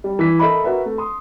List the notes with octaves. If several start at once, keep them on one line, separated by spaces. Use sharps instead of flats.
G3
E3 B6
A4 A#4 D#5 E5 B5
F#4 A#4 B4 E5
A3
C6 D#6